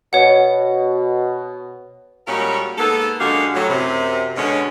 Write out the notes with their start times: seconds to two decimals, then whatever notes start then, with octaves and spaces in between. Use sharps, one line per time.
0.13 B2 C#5 F#5
2.27 A#2 G3 G#3 C#4 F#4 A#4
2.77 G#2 A#3 B3 A4
3.19 F#2 D3 G#3 F#4 G4 F5
3.54 A2 F#3
3.69 F#2 C3
4.36 B2 D3 G#3 C#4